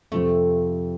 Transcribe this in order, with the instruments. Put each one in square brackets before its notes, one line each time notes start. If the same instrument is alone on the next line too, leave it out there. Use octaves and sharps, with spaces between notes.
[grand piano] F2 C3 F3 C4 [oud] A3